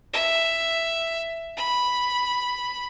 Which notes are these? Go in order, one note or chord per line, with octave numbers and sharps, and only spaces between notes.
E5
B5